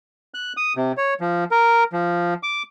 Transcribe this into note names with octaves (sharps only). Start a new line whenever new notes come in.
F#6
D#6
C3
C#5
F3
A#4
F3
D6